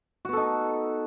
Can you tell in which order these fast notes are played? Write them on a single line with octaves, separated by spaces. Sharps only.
F#4 B3 A4 D#4